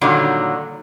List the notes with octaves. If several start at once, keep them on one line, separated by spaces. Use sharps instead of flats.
A#2 D3 D#3 F#3 G3